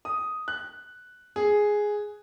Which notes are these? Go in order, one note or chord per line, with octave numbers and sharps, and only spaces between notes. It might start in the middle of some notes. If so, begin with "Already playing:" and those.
D#6
F#6
G#4